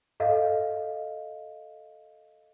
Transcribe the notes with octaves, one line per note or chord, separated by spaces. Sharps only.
A4 D#5 F5